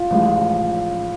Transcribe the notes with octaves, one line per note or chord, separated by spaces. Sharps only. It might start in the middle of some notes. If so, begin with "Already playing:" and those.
Already playing: F4
A1 A2 F3 G#3